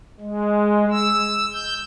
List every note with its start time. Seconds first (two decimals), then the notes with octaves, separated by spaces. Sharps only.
0.20 G#3
0.92 E6
1.53 G6